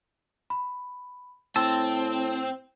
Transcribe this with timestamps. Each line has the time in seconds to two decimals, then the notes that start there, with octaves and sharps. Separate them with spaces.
0.50 B5
1.56 A2 C4 A5 C6 E6